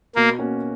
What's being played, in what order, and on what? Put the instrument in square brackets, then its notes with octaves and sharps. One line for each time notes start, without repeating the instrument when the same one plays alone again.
[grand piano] B2 [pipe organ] A#3
[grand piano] A#3 C#4 F#4